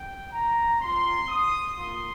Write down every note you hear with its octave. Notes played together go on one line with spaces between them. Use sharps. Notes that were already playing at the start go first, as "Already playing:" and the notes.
Already playing: G5
A#5
C4 F4 C6
D#6
A#3 F4 C6